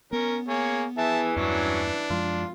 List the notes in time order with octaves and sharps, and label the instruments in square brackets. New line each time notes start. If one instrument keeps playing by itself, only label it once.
[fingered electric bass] B3 [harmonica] C#4 A#4
[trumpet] A#3 [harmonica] G#4 C#5
[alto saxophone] E3 [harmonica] G#4 E5 [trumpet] A5
[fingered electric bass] E2 G2 [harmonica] F#3 C#4 [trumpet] D4
[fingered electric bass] F#2 F3 G#3 [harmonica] F4